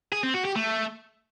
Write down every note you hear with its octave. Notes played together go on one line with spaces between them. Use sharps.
G#4
C4
F#4
G4
A3